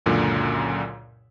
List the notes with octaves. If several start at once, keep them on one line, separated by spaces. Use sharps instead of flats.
C#2 F#2 A#2 D3